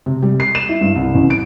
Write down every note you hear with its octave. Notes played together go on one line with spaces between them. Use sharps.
C3
G3
C7
E7
E4
G2
C2
A1
D7